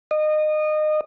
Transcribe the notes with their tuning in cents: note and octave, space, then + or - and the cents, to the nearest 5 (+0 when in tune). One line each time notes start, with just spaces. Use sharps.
D#5 -25